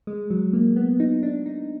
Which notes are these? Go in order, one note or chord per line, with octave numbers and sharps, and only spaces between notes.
G#3
F#3
A#3
B3
D#4
D4
D#4